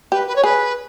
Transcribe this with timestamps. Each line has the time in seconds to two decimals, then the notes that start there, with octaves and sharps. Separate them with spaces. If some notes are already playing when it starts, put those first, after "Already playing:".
0.12 G4 B4
0.27 B4
0.36 C#5
0.43 G#4 B4